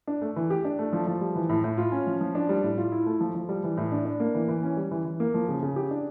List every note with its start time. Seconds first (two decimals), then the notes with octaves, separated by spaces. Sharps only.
0.07 D4
0.22 A3
0.36 E3
0.50 G4
0.65 D4
0.79 A3
0.93 F3
1.07 F3
1.21 G3
1.36 E3
1.49 A2
1.64 A2
1.78 F4
1.92 C#4
2.07 F3
2.21 F3
2.35 D4
2.49 G3
2.63 A2
2.78 F4
2.92 E4
3.06 A3
3.21 F3
3.35 F3
3.49 G3
3.64 E3
3.77 A2
3.92 D4
4.05 D4
4.20 A#3
4.35 E3
4.48 E3
4.63 C#4
4.77 G3
4.91 E3
5.05 E3
5.20 A#3
5.34 F3
5.48 C#3
5.63 C#3
5.76 G4
5.91 D4